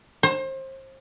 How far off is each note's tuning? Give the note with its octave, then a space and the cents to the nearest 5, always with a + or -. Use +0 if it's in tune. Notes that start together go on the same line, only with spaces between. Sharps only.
C5 +30